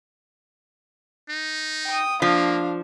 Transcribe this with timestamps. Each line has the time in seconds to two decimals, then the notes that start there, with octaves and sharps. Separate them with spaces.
1.29 D#4
1.86 G5 D#6
2.22 F3 A#3 D4 F5